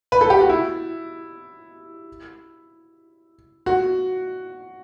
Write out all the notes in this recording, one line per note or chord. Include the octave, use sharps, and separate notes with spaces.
B4
A4
G4
F#4
E4
F#4